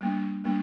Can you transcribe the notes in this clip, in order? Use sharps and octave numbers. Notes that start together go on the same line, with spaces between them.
G3 A#3 D4
G3 A#3 D4